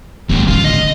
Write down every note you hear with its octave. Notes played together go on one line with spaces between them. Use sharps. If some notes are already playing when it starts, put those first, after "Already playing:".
A1 D#2 G#2 G#3
D3 F4
D#5